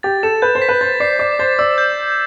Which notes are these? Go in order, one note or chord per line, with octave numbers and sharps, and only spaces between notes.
G4 A6
A4 E7
B4 G6
C5
B6
B4
C5 A6
D5 C7
D5 D6
C5 A6
D5 E6
G6